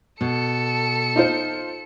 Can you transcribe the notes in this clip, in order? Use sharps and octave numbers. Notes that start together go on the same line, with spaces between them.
B2 A4 C#7
D#4 F4 C5